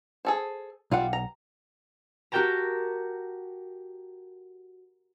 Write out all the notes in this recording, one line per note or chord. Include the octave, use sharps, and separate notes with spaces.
G#4 A4 C5
B1 G3 F4 F#5
A#5
F#4 G4 A#4 G5 A5 A#5